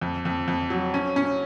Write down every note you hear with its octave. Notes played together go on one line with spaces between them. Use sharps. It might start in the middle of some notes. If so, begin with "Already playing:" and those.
F2
F2
F2
F#3
C#4
C#4